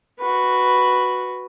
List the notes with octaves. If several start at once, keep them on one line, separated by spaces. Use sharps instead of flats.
F#4 B4